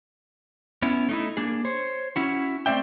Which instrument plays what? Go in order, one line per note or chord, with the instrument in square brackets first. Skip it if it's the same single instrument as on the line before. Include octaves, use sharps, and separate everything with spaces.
[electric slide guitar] B3 C#4 E4
A3 D#4 E4
A#3 D4 G#4
C5 C#5
C#4 E4 F#4
A3 C4 D5 E5 G5